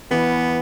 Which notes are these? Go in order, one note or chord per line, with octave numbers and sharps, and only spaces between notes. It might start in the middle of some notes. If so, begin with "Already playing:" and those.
E3 B3